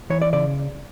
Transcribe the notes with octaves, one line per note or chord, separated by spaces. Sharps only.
E3 C#5
D5
C#3 D5